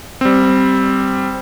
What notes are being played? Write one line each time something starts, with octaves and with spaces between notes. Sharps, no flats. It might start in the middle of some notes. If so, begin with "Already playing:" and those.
G3 C4